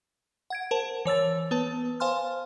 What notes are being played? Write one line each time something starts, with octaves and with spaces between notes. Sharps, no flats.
F#5 G#6 D7
A#4 C5 A5
E3 C#5 E6 A6
B3 B4 A5
C5 F5 G#5 C6 F6